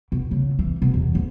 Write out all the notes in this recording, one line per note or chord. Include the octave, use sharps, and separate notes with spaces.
B2
C#3
E3
B2
E2
D2